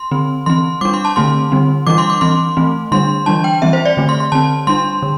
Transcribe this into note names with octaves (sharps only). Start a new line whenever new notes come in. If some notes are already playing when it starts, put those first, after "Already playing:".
Already playing: C6
D3 C4
E3 C4 C6
G3 D4 D6
C6
A5
D3 A3 C4 C6
D3 G3 C4
E3 G3 D4 D6
C6
D6
E3 C4 C6
E3 A3 C4
D3 G3 D4 C6
E3 G3 D4 A5
G5
E3 G3 C4 E5
C5
D5
D3 A3 C4
C6
C6
D3 C4 A5
G3 D4 C6
D3